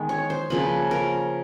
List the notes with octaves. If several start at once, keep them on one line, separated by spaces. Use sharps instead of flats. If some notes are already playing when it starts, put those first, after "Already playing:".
Already playing: D#3 G#3 B3
C#5
C5
C#3 F3 A#3 B4
A#4